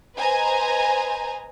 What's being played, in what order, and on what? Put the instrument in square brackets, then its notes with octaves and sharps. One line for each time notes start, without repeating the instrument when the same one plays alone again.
[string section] B4 C5 D#5 G#5 A#5